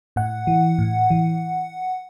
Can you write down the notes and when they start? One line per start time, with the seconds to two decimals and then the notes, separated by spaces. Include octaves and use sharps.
0.16 A2 F#5
0.47 E3
0.78 A2
1.10 E3